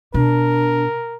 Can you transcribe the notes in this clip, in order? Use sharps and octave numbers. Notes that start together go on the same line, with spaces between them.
B2 D4 A#4